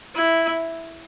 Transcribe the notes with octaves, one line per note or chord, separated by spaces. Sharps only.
E4